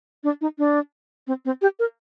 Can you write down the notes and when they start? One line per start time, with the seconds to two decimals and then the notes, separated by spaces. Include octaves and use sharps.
0.24 D4
0.41 D#4
0.58 D4
1.27 C4
1.45 C4
1.62 G4
1.79 A#4